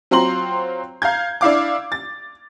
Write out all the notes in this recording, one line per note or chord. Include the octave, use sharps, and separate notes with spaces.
F#3 C4 F4 A#5 C6 F#7
F5 A#5 G6 G#6
D4 E4 F5 D6
A6